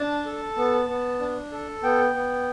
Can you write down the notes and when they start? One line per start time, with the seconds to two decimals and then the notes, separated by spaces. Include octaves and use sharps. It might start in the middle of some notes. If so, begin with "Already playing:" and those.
Already playing: D4 A5
0.25 A4
0.56 B3
0.89 B3
1.20 D4
1.52 A4
1.82 B3 G5
2.14 B3